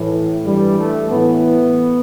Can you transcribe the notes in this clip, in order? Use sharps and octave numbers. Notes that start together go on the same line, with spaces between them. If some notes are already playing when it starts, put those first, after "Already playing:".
Already playing: A2 E3
G2 E3 G3
A3
A2 E3 B3